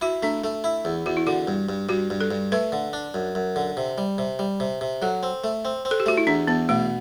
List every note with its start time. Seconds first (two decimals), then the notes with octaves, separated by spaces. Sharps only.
0.01 E4 F#4
0.23 A3 D4
0.44 A3
0.64 E4
0.85 E2
1.06 E2 F#4
1.17 E4
1.27 D3 F#4
1.48 G2
1.69 G2
1.89 G2 F#4
2.10 G2
2.21 A4
2.31 G2
2.52 A3 B4
2.72 D3
2.93 D4
3.14 F#2
3.35 F#2
3.56 D3
3.77 C3
3.98 G3
4.18 C3
4.39 G3
4.60 C3
4.81 C3
5.02 F#3 A4
5.23 C4
5.44 A3
5.65 C4
5.85 C4
5.91 A4
6.00 G4
6.06 A3 F#4
6.17 E4
6.27 E2 D4
6.47 E2 B3
6.69 B2 A3